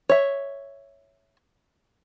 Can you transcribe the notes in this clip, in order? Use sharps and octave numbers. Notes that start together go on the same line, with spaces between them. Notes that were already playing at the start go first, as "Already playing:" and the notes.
C#5 E5